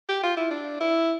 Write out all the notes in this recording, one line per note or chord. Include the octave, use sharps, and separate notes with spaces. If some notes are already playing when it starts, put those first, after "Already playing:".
G4
F4
E4
D4
E4